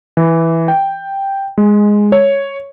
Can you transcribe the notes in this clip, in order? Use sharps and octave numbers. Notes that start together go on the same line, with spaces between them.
E3
G5
G#3
C#5